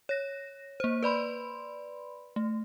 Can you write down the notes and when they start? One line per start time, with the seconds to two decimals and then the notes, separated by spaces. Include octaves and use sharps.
0.09 C#5 A#6
0.80 A#3 C5
1.03 B4 D5 B5 C6
2.36 A3